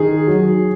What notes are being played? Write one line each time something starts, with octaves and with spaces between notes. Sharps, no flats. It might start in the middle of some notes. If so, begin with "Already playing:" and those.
Already playing: D#3 G#4
F#3